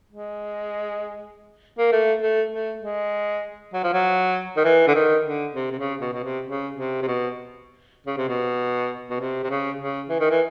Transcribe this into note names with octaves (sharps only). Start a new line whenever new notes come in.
G#3
A#3
A3
A3
A3
G#3
F#3
F3
F#3
D#3
E3
D3
D#3
D3
C3
C3
C#3
B2
B2
C3
C#3
C3
C3
B2
C#3
C3
B2
B2
C3
C3
C#3
C#3
E3
D#3
E3